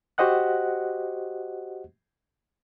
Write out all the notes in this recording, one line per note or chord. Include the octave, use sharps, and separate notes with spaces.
F#4 G4 C5 D#5 F#5 F#6